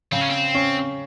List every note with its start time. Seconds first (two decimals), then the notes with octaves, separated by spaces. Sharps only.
0.12 C#3 C4
0.21 C#4
0.30 C4
0.55 C#4